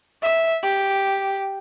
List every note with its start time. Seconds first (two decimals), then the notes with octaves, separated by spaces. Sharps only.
0.22 E5
0.63 G4